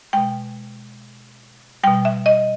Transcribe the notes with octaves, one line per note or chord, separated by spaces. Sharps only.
B2 G#3 G5
B2 G3 G5
E5
D#5